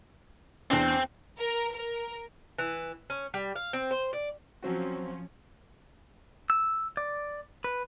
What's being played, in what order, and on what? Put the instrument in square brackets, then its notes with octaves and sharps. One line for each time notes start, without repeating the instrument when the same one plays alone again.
[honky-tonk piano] E2 D4 [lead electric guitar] C4
[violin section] A#4
A#4
[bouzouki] E3
C#4
G3
F5
C4
C5
D5
[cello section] F3 C#4 [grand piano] F#3 C4 F#4
[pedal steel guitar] E6
D5
B4